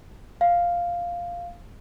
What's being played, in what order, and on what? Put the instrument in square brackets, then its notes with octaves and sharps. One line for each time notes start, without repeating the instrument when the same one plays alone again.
[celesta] F5